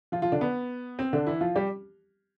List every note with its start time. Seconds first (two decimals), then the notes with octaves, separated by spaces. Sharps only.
0.12 F3 F4
0.22 F3 F4
0.32 D3 D4
0.41 B3
0.99 C4
1.13 D3 D4
1.27 E3 E4
1.41 F3 F4
1.56 G3 G4